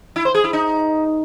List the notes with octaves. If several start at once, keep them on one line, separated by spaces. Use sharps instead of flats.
E4
C5
G#4
E4
D#4